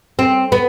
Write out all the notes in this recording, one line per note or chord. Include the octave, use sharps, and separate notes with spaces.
C4
B3